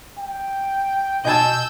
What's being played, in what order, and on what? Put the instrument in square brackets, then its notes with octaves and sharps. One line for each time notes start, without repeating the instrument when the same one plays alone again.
[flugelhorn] G5
[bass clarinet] B2 [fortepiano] D#5 G#5 A5 [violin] E6 G6